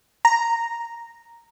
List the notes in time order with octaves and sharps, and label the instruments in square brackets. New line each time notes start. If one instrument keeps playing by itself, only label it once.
[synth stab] A#5